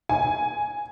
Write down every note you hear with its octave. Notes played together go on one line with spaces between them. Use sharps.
G#5